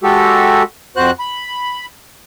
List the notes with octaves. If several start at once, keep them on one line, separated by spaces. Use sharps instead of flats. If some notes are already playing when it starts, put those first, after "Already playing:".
G#3 F#4 G4 A4
F2 F#4 C5 F#6
B5